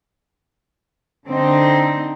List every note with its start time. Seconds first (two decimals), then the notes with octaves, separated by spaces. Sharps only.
1.26 D3 C4 D#4